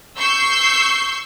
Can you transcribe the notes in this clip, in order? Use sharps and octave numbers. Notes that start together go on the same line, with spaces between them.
C#6 E6 G6 C7